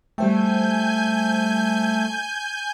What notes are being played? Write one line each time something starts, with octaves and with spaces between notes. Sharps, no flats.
G3 A3 C5 G5 G#5 G6